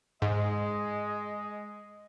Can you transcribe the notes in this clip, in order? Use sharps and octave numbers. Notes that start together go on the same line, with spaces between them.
G#2 G#3 D#5